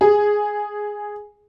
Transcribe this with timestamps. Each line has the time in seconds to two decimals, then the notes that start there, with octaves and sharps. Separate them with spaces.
0.01 G#4